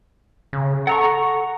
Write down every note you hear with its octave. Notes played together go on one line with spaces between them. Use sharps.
C#3
A4 F#5 A#5 C#6